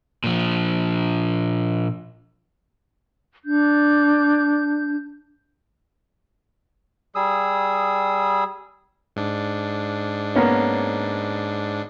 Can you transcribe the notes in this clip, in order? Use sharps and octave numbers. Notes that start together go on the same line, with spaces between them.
A#2 F3
D4 G6
G3 G#4 D#6 E6
G#2 D4
A#3 B3 C#4